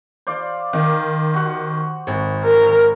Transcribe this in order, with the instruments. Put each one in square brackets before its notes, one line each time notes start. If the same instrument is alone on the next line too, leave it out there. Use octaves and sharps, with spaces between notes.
[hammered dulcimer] C5 D5 F5
[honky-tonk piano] D#3
[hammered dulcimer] F#4 F#5
[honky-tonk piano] G#1
[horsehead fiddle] A#4